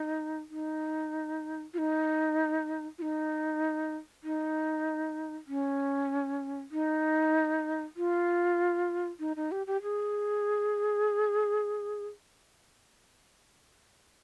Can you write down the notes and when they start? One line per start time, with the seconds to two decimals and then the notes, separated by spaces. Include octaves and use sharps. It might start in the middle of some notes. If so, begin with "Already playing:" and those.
Already playing: D#4
0.50 D#4
1.74 F4
1.78 D#4
2.98 F4
3.02 D#4
4.24 D#4
5.47 C#4
6.71 D#4
7.96 F4
9.20 D#4
9.36 D#4
9.52 G4
9.67 G4
9.82 G#4